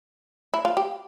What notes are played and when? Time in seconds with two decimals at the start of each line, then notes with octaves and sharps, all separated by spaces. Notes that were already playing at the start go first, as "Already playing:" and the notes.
0.54 E4
0.65 F4
0.77 G4